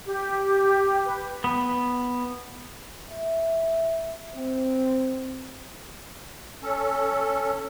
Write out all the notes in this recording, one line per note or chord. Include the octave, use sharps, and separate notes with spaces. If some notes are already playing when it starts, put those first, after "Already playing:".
G4
B4
B3
E5
C4
C#4 A4